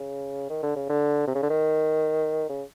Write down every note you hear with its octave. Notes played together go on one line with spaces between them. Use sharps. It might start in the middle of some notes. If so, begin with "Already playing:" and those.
Already playing: C#3
D#3
D3
C#3
D3
C3
C#3
D3
D#3
C#3